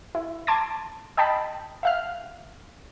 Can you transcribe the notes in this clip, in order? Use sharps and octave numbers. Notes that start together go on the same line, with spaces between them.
E4
A5 C6 D6 G#6 A6
D#5 G5 A5 B5
E5 F5 F6